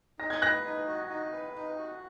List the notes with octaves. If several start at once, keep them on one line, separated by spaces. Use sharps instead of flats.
D#4 A#6
G#6
B4 F#6 A#6
D#4
F#4
D#4
B4
D#4
F#4